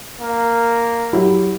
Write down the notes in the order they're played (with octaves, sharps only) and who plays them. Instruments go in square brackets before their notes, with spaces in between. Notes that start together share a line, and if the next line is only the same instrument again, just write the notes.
[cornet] A#3
[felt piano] F#3 E4 G4